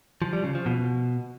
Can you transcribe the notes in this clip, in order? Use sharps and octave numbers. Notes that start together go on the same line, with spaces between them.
F3
G3
C#3
F3
B2